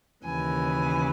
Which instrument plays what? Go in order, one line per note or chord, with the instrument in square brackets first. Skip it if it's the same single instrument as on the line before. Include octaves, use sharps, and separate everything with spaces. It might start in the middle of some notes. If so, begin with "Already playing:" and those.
[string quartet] D#2 C#3 E3 G#5